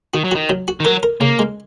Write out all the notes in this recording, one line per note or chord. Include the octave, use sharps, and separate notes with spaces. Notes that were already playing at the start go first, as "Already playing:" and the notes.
D#3 F#4
F#3
D#3 F#4
F#3
F#4
D#3
F#3 A#4
A#4
C#3 A#3
G#3